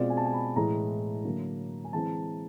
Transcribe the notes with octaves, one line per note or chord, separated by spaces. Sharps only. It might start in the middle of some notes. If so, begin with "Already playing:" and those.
Already playing: B2 G#3 C4 F4 D5
G#5
A5
G#5
B5
A2 E3 G#3 A#5
D3 F#3 A#3
G#5
E3 G#3 C4 A5